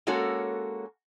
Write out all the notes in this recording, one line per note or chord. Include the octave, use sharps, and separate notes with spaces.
G#3 A#3 C#4 F#4 A4 C#5